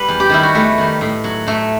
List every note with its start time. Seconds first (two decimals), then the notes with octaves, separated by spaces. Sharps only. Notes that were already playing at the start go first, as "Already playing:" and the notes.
Already playing: G3 B4
0.08 E2
0.20 G4
0.29 D#3 G3 E4
0.43 F#4
0.55 E2 A3
0.78 D#3 G3
1.01 A2
1.24 F#3
1.47 A2 A3